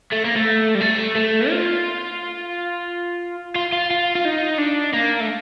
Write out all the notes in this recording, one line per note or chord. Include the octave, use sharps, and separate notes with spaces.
A3
A#3
A3
G3
A3
A3
F4
F4
F4
F4
F4
D#4
D4
A#3
A3